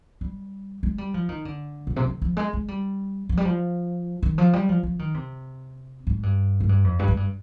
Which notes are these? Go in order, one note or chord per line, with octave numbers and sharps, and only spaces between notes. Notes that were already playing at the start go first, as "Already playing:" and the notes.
G3
G#3
G3
F3
D#3
D3
A#2
C3
D3
F3
G#3
G#3
G3
F3
G3
F3
D#3
F3
G3
F3
F3
D#3
C3
G#2
G2
G#2
G2
F2
G2
G#2
G2